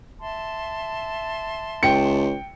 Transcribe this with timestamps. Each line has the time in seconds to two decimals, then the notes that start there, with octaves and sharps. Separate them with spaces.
0.20 E5 A5 C6
1.83 C#2 G5 C#7